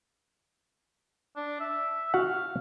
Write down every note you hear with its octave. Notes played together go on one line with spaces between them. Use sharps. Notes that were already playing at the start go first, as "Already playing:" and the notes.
D4
E5
F#4 F5 F#5